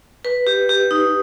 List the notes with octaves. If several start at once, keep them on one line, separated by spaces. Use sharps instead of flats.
B4
G4
G4
D#4